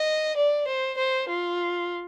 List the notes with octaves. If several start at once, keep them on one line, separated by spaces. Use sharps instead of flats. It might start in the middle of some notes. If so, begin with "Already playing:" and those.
Already playing: D#5
D5
C5
C5
F4